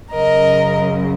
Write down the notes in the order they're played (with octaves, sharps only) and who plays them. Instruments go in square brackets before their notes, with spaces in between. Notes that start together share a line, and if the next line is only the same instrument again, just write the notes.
[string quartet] F#2 C#3 A#4 D#5